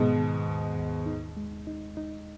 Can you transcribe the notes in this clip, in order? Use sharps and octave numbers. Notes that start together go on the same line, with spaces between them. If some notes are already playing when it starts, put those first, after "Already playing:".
Already playing: G#2 B2 D#3 G#3
D#3
D#2
D#2
D#4
G#3
D#4
D#4